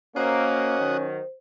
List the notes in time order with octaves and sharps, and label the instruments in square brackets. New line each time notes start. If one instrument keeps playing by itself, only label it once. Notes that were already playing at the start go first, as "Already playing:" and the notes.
[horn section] A#3 [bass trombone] C#4 [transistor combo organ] F#4 D#5 [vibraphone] C5
[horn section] D#3 F#3